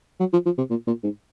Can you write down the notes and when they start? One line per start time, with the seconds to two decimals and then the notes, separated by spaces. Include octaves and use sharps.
0.20 F#3
0.33 F3
0.45 F3
0.58 C3
0.70 A#2
0.87 A#2
1.03 G#2